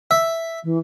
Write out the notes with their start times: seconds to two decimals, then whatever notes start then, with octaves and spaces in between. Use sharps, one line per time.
0.11 E5
0.64 E3